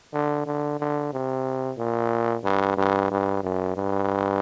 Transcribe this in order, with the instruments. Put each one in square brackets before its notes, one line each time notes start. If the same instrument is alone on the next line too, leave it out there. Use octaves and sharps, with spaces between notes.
[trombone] D3
D3
D3
C3
A#2
G2
G2
G2
F#2
G2